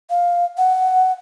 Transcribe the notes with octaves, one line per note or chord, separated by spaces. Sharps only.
F5
F#5